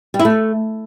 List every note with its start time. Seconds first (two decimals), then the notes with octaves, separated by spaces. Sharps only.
0.14 G3
0.19 E4
0.25 A3